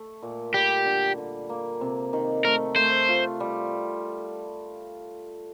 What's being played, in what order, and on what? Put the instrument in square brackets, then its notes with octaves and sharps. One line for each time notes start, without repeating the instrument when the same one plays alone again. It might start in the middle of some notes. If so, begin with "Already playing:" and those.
Already playing: [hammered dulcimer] A3
A#2
[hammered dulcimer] G3 [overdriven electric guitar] G4
[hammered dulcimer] D3
D3
A#3
C3
D#3
[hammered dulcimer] A3 [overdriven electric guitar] A#4
[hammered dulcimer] A3 [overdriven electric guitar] C5
[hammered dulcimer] F4
G3